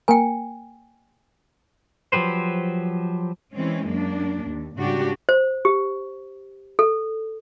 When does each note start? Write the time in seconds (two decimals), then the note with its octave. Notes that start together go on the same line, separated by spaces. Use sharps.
0.08 A#3 A#4 G5 G#5 A#5
2.12 F3 F#3 G4 B4 C5
3.54 E3 G#3 C4 C#4
3.89 F#2 A#3 D4
4.47 D#2
4.79 G#2 C#3 G3 D4 F#4 G4
5.29 C5
5.65 G4
6.79 A4